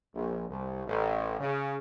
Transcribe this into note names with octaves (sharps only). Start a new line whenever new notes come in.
A#1
C2
A1
C#3